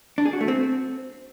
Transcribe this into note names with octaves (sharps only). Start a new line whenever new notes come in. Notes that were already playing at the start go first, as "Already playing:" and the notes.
D4
G#4
F#4
A3
C4